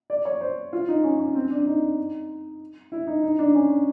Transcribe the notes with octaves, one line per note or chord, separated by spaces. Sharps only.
D5
C#5
C5
F4
D#4
C#4
C#4
C4
D4
D#4
E4
D#4
D#4
D4
C#4